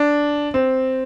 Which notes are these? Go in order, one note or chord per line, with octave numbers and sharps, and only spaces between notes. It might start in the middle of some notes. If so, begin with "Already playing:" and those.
Already playing: D4
C4